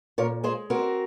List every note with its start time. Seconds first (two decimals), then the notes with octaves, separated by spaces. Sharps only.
0.18 A#2 A#4 C#5
0.44 G#3 G#4 C5
0.70 C4 F#4 A#4